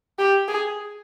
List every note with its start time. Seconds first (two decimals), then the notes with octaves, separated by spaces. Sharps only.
0.19 G4
0.48 G#4